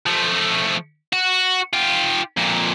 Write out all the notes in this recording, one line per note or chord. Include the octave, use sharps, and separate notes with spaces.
F3 A3
F#4
F4 G4
F2 A#2